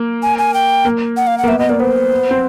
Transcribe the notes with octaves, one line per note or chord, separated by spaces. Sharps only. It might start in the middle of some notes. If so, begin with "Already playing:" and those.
Already playing: A#3
G#5
G#5
G5
A#3
F#5
F5
F#5
A#3
B3 E5
B3 D#5
A#3 D5
B3 C5
C4